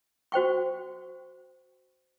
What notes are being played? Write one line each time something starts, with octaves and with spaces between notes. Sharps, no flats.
F#4 C5 G5 C#6